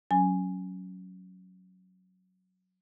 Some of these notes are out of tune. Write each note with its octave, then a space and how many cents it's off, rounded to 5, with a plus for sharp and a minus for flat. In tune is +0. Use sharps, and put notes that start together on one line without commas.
F#3 +0 C#4 +0 G#5 +0